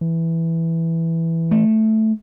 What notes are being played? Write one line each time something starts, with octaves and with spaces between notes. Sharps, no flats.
E3
A3